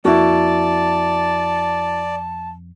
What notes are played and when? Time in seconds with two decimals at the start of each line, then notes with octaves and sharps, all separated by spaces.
0.05 F2 A#3 E4 F#4 D5 A5